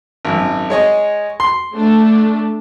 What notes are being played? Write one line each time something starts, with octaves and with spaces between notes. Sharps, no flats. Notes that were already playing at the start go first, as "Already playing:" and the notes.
G#1 F#2
G#3 C#5 D#5
C6
A3 D4